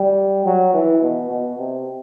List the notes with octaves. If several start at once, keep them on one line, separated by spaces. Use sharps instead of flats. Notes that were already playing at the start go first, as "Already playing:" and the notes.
Already playing: G3
F#3
E3
B2
B2
C3